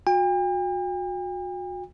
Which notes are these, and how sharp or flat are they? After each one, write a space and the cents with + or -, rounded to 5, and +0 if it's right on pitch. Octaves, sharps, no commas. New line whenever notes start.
F#4 -35 G5 +45